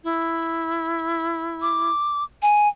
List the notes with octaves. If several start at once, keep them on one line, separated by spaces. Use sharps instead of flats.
E4
D6
G#5